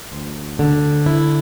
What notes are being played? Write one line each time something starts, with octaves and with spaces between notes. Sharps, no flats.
D2
D3
E4